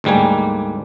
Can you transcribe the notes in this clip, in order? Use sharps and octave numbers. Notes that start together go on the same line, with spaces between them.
D2 G#2 G3 A#3 G#5